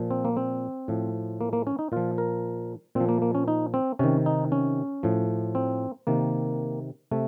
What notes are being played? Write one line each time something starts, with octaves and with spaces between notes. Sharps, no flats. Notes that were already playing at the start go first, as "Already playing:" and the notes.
Already playing: A#2 F3
C4
A#3
C4
A2 F3
A#3
A#3
C#4
D#4
A#2 F3 F4
A#4
A#2 F3 C4
A#3
A#3
C#4
D#4
C4
C3 D#3 C#4
D#4
C#4
A2 F3
C4
C3 D#3 A#3
C3 A3